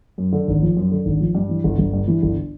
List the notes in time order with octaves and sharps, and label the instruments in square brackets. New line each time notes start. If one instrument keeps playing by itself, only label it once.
[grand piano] F#2
D3
G#1
F3
F#2
D3
G#1
F3
G2
E3
G1
G1
G2
E3
G1